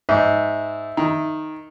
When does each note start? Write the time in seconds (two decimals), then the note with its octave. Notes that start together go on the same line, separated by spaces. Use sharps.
0.09 G#2 E5
0.97 D#3